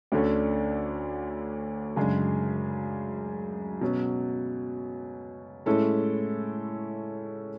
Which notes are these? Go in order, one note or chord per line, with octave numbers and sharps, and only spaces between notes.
D2 D3 A3 C#4
F#2 C#3 G#3 D4 G#4
B2 F#3 C#4
A2 G#3 C#4 E4 A4